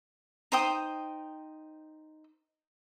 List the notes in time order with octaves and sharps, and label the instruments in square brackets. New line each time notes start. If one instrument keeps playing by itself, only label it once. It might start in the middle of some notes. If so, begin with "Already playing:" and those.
[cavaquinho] D#4 C5 G5 D#6